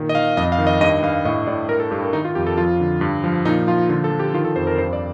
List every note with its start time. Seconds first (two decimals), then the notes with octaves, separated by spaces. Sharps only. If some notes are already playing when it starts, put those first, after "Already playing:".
Already playing: A#2 D#3
0.09 D#5
0.15 D#3 F5
0.37 F2 D#5
0.52 F5
0.58 D#3
0.67 D#5
0.81 G2 D#5
1.03 G2 F5
1.25 A2 D#5
1.47 A2 D5
1.69 G2 A#4
1.80 A4
1.91 G2 G4
2.02 A#4
2.13 D#3 D#4
2.25 F4
2.35 F2 G4
2.47 A4
2.57 F3 F4
2.80 D3
3.01 G2
3.24 F3
3.45 A#2 D#4
3.67 F3 F4
3.89 D3 F4
4.04 A4
4.12 F3
4.20 G4
4.34 D#3 F4
4.45 A4
4.56 F2 C5
4.67 A#4
4.78 G2 C5
4.93 D5